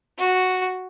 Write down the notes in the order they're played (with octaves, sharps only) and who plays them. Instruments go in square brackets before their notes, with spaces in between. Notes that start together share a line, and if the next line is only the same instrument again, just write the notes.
[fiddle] F#4